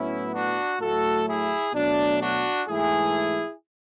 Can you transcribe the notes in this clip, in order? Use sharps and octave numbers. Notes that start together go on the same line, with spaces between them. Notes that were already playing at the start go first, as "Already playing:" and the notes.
Already playing: A2 F#3 B3 C#4 E4
D4 F#4
A2 F#3 A3 F#4 A4
E4 G#4
B2 F#3 A3 D4
D4 F#4
G#2 E3 A3 E4 G#4